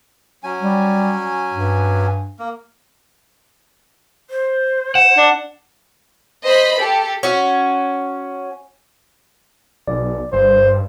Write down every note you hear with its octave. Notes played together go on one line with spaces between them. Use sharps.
F#3 C#4 G#5
G3
G2
A#3
C5
F#5 E7
D4
C5 D#5 B5
G4 A4
C#4 F#4
B1 D5
G1 G2 C5